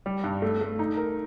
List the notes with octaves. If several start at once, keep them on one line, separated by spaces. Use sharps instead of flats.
G3
G2
A3
A3
D#4
A#4